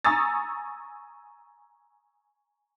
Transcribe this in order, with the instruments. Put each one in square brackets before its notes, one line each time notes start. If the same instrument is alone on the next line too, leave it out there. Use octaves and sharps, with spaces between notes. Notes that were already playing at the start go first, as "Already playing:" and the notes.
[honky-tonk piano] G#5 A#5 C#6 D#6 E6 A6